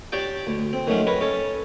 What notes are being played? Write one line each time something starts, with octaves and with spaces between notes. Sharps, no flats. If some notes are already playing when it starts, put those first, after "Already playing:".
D4 G4 C#5 D5 G5
D2
C4
D#3 F#3 A3 C#4 D4
A#4 B4 C#5
C#4 A4 C#5